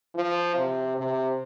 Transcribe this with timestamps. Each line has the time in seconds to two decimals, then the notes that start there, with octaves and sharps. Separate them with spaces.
0.15 F3
0.55 C3
0.97 C3